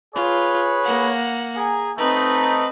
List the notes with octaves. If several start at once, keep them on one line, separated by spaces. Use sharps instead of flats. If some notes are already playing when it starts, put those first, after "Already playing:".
F4 G#4 B4 C#5
A#3 F#5
G#4 G#5 A#5
A3 C4 D#4 B4